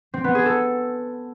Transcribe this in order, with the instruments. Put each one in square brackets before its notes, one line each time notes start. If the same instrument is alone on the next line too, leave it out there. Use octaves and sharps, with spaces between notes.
[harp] C4
B3
G#4
A4